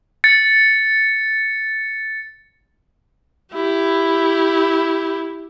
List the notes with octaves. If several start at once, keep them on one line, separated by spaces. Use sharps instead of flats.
A6 C#7
E4 G4